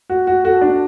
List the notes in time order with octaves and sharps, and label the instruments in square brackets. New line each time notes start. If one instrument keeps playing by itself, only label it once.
[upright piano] F#4
F#4
[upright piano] F#4 [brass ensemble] A4
[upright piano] D4